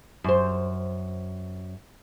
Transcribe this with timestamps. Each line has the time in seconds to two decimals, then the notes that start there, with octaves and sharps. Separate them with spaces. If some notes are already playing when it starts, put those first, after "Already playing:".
0.24 F#2 C5